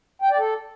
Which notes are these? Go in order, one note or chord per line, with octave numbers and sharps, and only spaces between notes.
G5
D5
A4